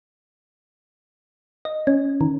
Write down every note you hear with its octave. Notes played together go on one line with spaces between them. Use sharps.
D#5
C#4
D#3